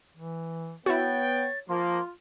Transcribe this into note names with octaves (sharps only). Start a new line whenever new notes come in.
E3
B3 E4 F#4 C#5 G5 A6
F3 A#3 F4 C6